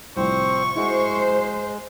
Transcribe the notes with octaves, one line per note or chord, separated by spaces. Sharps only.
C2 A2 F3 C4 C5 C#6
G#3 E4 F#4 C5